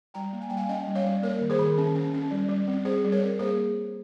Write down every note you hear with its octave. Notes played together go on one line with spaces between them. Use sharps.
G3 G5 A#5
A#3
G#5
G3 G5
F5 G#5
C#4 D#5 G5
G3
C#5 F5
G3
A#3 A#4 C#5
D#3
G#4 C5
D#3
C#4
C#4
C#4
G3
G3
C4
C4 G#4 C5
G3
A#4 C#5
C4
A#3 G#4 C5